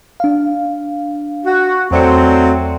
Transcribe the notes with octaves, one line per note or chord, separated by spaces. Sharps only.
D4 F5
F#4
E2 F#3 A3 C4 D5 C#7